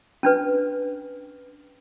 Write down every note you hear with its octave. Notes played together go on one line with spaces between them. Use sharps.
C#4 D4 B4